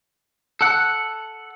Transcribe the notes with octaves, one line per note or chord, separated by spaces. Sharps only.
A4 F#5